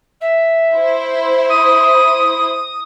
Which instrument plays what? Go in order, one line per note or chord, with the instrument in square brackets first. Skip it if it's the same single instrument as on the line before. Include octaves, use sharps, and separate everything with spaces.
[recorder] E5
[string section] E4 C5
[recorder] D#6